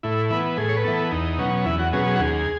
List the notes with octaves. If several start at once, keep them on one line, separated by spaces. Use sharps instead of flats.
A2 E4
E3 B3
A2 G#4
C#5
B4
E3 B3 A4
E2 D#4
B2 F#3 C#4
E2 E4
F#4
B2 F#3 C#4 G#4
G#4
F#4
D#2 G#4